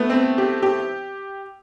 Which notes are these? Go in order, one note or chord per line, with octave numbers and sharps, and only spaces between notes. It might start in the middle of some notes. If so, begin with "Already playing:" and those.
Already playing: A3 B3
C4
G4
G4